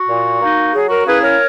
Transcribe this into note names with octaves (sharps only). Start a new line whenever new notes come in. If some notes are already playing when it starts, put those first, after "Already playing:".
Already playing: F#4
A#2
A#3 D#4
F#3 G#4
F#4 A#4
A#3 C#4 E4 G#4 B4
A#4 C#5